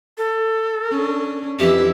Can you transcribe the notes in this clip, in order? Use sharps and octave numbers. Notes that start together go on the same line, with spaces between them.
A4
C#4 D4
F2 E3 E4 G4 E5